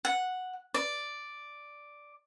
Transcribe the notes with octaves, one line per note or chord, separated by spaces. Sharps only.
F#5
D5